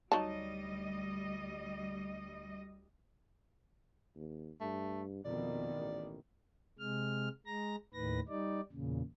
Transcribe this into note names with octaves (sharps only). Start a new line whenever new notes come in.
D2 F#3 G3 D#4 D#5 A5
D#2
G2 A3
F2 B2 D#3 A#3 D5
A1
C3 G#3 F6
G#3 A#5 A#6
D#2 A2 D#3 B4 A#6
G3 D#4 D5
E2 A#2 C#3